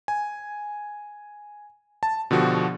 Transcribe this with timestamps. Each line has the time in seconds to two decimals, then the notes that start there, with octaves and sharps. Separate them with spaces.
0.08 G#5
2.03 A5
2.31 B2 D3 F3 F#4 G4